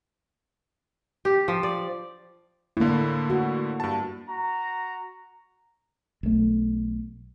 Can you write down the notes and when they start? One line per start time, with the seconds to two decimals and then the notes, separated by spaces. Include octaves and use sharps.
1.25 G4
1.48 F3
1.63 D5
2.77 A2 D3 A#3 E4
3.30 F#4
3.80 G2 A5
4.28 F#4 A#5
6.23 B1 A3